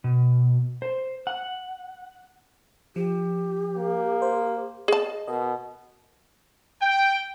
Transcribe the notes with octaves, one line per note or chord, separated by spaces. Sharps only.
B2
C5
F#5
F3 G4
A#3
C5
G#4 D#5 A5
B2 A#4 D#5
G5